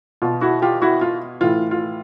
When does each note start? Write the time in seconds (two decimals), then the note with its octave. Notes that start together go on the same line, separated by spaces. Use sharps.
0.22 B2 F4
0.41 E4 F#4
0.62 F4 G4
0.82 E4 F#4
1.01 F4
1.41 A2 E3 F4
1.71 F4